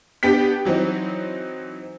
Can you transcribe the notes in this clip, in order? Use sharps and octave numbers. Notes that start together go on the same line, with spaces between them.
B3 D4 G4 G5 B6
E3 F#3 C4 D#4